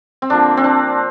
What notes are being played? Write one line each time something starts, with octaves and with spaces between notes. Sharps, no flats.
C4
D3 F3 A#3 D4
C4
D4